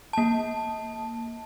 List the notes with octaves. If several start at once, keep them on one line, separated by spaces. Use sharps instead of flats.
A#3 A5